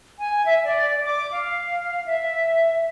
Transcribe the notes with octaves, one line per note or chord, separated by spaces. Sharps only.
G#5
E5
D5
D6
F5
E5